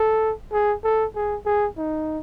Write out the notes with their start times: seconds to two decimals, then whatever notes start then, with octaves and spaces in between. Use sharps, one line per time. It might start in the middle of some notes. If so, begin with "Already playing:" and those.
Already playing: A4
0.52 G#4
0.84 A4
1.15 G#4
1.45 G#4
1.77 D#4